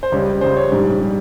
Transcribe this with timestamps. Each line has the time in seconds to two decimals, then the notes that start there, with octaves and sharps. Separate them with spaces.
0.03 C5
0.12 C#2 C#3 G3 C#5
0.41 C#2 C#3 G3 C5
0.57 C#5
0.72 A#1 G#2 G3
1.01 G3